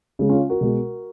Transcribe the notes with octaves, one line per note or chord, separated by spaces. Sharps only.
C#3 G#3
C#4 F4
F#4 A#4
B2 G#3